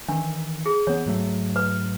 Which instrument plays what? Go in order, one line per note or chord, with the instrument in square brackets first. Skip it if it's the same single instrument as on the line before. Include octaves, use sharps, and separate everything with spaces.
[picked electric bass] D#3 E3 [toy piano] D4
[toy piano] G#4
[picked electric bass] E3 B3 [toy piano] C#5
[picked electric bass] G#2 F#3 A3
[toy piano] B4